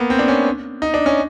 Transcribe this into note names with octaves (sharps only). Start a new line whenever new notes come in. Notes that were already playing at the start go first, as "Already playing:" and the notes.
Already playing: A#3 B3
C4
D4
C#4
D#4
D4
C#4